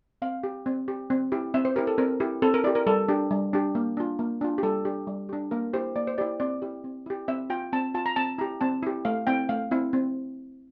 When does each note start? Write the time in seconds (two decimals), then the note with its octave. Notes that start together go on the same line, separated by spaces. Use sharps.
0.22 C4 F5
0.44 G4
0.66 C4
0.88 G4
1.10 C4
1.32 E4 G4
1.54 C4 E5
1.65 C5
1.76 E4 G4 A#4
1.87 A4
1.98 C4 A#4
2.20 E4 G4
2.42 C4 A4
2.54 A#4
2.64 E4 D5
2.67 G4
2.75 A#4
2.86 G3 A4
3.08 D4 G4
3.31 G3
3.53 D4 G4
3.75 A#3
3.97 D4 F4
4.19 A#3
4.41 D4 F4
4.58 G4
4.63 G3 A4
4.85 D4 G4
5.07 G3
5.29 D4 G4
5.51 A#3 A#4
5.73 E4 G4 C5
5.96 A#3 D5
6.07 C5
6.18 E4 G4 D5
6.40 C4 D5
6.62 E4 G4
6.84 C4
7.06 E4 G4
7.28 C4 E5
7.50 F4 G5
7.73 C4 A5
7.94 F4 A5
8.06 A#5
8.16 C4 A5
8.38 E4 G4 A#5
8.61 C4 A5
8.83 E4 G4
9.05 A3 F5
9.27 C4 E4 G5
9.49 A3 F5
9.71 C4 E4
9.93 C4